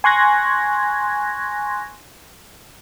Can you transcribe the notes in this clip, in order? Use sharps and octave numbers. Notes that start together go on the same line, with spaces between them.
G#5 C6 C#6 F#6 G#6 A#6